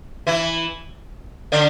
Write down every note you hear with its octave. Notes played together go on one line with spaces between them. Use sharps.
E3 E4
D3 D4